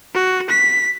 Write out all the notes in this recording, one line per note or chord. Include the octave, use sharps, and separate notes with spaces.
F#4
B6